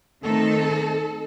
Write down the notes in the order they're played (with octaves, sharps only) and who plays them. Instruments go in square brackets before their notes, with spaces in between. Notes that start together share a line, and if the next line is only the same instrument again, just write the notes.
[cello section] D#3 A3 C4 D#4 A4